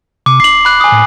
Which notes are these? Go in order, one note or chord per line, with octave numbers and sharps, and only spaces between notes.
C3 D6
D1 C7 F#7
B5 F#6
G#5 D#6
A2